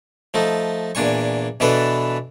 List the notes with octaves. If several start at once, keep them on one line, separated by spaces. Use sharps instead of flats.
F3 A3 D#4
E2 A#2 D4 G#5 C#6
B2 E3 B3 D4 A4 B4